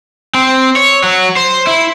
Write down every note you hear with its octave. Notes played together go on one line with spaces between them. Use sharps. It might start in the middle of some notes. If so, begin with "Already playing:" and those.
C4
C#5
F#3
C5
E4